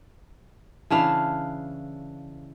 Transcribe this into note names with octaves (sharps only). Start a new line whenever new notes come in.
C#3 E3 D4 F5